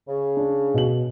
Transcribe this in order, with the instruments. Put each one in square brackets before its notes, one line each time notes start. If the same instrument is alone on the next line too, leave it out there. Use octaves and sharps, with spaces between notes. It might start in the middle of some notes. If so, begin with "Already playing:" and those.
[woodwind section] C#3
[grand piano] D4
B2 F#7